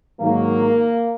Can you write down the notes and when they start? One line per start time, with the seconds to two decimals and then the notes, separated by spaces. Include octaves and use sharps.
0.20 G#2 D#3 F#3 A#3